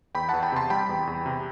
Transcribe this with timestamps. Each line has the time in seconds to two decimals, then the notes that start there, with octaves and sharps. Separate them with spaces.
0.15 E2 G5 B5
0.29 E2 F#5 A5
0.43 G5 B5
0.52 C3 A5 C6
0.70 G3 G5 B5
0.89 E2
1.07 E2
1.26 C3